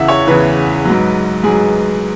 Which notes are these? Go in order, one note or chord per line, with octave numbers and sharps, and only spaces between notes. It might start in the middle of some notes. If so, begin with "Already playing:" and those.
Already playing: E2 C#3 E3 E5 F#5
C#5
E2 C#3 E3 B4
G#2 F#3
G#2 F#3 G#4